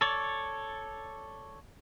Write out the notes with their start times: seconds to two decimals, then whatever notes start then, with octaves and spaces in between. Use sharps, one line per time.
0.01 A4 C#5 D5